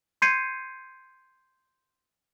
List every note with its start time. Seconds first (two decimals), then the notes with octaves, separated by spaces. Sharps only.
0.22 C6 G6 G#6 C7 C#7 D#7